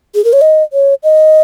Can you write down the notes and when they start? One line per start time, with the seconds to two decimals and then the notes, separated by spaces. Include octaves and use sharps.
0.15 G#4
0.24 A#4
0.33 C#5
0.41 D#5
0.73 C#5
1.03 D#5